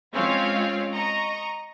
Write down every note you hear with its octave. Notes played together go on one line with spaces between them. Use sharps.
G#3 C4 C#4 F4 C#5 F5
D#5 A#5 C#6